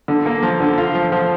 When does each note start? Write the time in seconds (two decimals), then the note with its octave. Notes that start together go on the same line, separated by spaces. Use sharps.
0.08 D3
0.26 A#3
0.43 F3
0.60 D3
0.78 F4
0.95 F3
1.12 F3